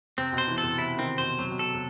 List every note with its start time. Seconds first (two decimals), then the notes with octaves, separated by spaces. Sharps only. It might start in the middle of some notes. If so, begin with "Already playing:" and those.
0.18 C3 C4
0.33 B2
0.38 C5
0.48 E3
0.58 A4
0.63 C3
0.78 C3 E4
0.98 D#3 C4
1.18 B2 C5
1.39 C3 F#3
1.51 B2
1.59 C3 A4
1.74 C3